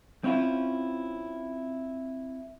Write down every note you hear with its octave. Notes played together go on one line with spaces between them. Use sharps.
C4 C#4 E4 F4